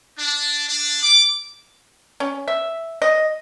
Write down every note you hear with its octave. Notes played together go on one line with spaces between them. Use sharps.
D4
D4
D6
C#4
E5
D#5